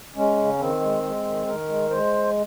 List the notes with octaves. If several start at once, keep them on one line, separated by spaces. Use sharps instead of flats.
G#3 C#4
C#3
D#3 C4
G#3
G#3
D#3
D#3 A#4
G#3
G#3 C5